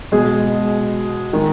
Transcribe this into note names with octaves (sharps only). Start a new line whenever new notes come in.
B2 G#3 G#4
D#3 G#3